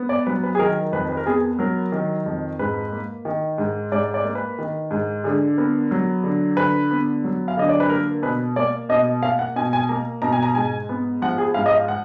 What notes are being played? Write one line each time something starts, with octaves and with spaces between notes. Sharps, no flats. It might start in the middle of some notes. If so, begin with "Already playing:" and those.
Already playing: B3
D5
F#3 B4
B4
G#4
D#3 A#4
F2 B4
B4
A#4
B3 G#4
F#3 A#4
D#3
F2
G#2 B4
A#3
D#3
G#2
G#2 D5
D5
A#3
B4
D#3
G#2
D3 G#4
B3 A#4
F#3
D3
D3 B4
B3
F#3
F5
D3 D#5
D5
B4
A#3 A#4
B2 B4
A#3 D5
B2 D#5
A#3 F5
F#5
B2 G#5
G#5
A#3 A#5
B2 A#5
G#5
A#5
G#2 G#5
B3
F3 F#5
G#4
G#2 F5
D#5
F5
F#5